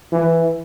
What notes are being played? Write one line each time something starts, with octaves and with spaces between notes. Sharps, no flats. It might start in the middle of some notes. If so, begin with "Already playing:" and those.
E3